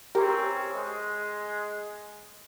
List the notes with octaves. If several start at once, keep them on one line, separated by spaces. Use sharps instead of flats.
E3 C4 C#4 G4 A#4
G#3